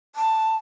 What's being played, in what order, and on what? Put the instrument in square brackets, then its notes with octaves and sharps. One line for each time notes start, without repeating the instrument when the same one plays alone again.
[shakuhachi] A5